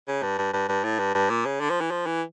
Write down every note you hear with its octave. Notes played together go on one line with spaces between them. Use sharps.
C#3
G2
G2
G2
G2
A2
G2
G2
A#2
C#3
D3
F3
E3
F3
E3